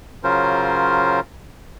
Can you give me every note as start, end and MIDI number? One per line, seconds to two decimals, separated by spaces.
0.24 1.20 49
0.24 1.20 54
0.24 1.20 61
0.24 1.20 65
0.24 1.20 70
0.24 1.20 72